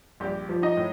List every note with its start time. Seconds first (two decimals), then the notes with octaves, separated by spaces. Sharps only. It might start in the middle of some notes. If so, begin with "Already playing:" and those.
0.20 A#1 G3 G4
0.49 F3
0.62 D#4 D#5
0.77 A2